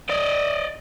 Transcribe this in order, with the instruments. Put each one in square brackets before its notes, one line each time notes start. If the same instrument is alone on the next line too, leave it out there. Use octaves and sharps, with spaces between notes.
[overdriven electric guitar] D5 D#5